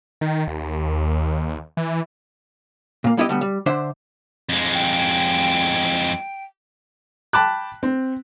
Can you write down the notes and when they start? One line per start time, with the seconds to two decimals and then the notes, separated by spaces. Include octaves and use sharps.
0.21 D#3
0.48 D#2
1.77 E3
3.04 A#2 A#3
3.17 G3 B3 E4 G4 C5 D#5
3.29 D3 G3 B3
3.41 G3
3.66 D3 D4 C5 E5
4.49 F2 G#3
4.74 G5
7.33 G5 A5 B5 D6 F#6
7.83 C4